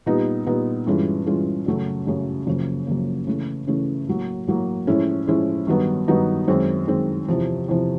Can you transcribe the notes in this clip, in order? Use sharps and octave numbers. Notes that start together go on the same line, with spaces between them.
A#2 G3 B3 D#4
A#2 G3 B3 D#4
G2 E3 G#3 C#4 F4
G2 E3 G#3 C#4 F4
F#2 C#3 F#3 A3 C#4
F#2 C#3 F#3 A3 C#4
F#2 C#3 F3 A#3
F#2 C#3 F3 A#3
C#3 E3 A3 C#4
C#3 E3 A3 C#4
A2 F#3 A#3
A2 F#3 A#3
A2 F3 G#3 C#4 E4
A2 F3 G#3 C#4 E4
G2 D#3 F#3 B3 D#4
G2 D#3 F#3 B3 D#4
F#2 D#3 G#3 C4
F#2 D#3 G#3 C4
E2 C3 F3
E2 C3 F3